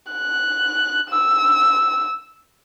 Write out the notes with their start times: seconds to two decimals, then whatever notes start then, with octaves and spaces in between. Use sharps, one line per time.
0.12 F#6
1.10 E6